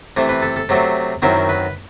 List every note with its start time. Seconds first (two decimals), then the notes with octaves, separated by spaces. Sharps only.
0.17 C3 E3 A3 C4
0.29 B4
0.42 A4
0.56 A4
0.69 C3 F#3 A3 C4
1.22 F#2 D#3 F#3 C4 E4
1.49 B4